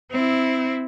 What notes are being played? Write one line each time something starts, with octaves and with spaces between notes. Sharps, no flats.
C4 E4